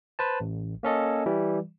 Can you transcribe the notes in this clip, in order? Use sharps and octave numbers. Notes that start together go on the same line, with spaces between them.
B4 C5 A5
A1
A#3 C#4 A4 D#5
E3 G3